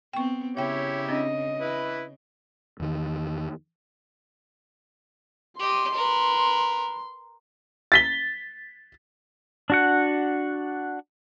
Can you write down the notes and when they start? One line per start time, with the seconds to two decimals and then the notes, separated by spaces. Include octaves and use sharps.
0.13 B3 C4 G5 C#6
0.57 C#3 E4 G4 C#5 E5 G5
1.09 C4 D4 D#5
1.61 E4 B4
2.80 E2 D#3
5.59 G4 D#5 C6
5.94 A#4 B4
7.92 A6 B6 G7
9.70 D4 F#4 F#5